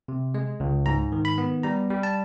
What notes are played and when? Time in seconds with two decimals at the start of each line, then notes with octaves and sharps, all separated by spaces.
0.08 C3
0.34 G#3
0.60 C#2
0.86 G#2 A#5
1.12 D#3
1.25 B5
1.38 B3
1.63 G3 A#5
1.90 G3
2.03 A5